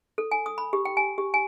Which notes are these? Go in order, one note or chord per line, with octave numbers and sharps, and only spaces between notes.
A4
G#5
D#6
B5
G4
G5
G#5
G4
G#5